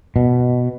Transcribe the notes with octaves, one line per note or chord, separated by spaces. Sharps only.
B2